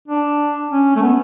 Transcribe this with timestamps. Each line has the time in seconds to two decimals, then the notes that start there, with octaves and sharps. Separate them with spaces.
0.08 D4
0.71 C#4
0.96 A3
1.02 B3